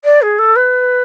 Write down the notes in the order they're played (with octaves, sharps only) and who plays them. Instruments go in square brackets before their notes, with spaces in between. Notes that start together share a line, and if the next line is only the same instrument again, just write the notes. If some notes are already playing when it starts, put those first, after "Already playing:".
[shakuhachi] D5
G#4
A4
B4